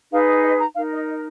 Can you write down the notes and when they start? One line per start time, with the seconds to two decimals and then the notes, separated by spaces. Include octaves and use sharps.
0.12 D#4 G#4 B4 F5
0.28 D#5
0.44 D#5
0.60 A#5
0.75 D#4 A#4 F5
0.92 D#5
1.08 D#5